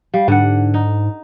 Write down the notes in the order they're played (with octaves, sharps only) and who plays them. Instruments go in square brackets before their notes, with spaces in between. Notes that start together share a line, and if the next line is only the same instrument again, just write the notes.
[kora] G3 [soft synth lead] F5
[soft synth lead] G#2 [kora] D3 F#5
[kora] D#4